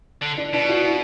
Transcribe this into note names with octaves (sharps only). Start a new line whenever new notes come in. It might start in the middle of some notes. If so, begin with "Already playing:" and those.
D3
D4
B2 D4
F#4
E4